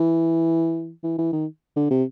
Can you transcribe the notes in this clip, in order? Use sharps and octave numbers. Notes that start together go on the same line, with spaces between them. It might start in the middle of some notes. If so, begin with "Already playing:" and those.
Already playing: E3
E3
E3
D#3
D3
C3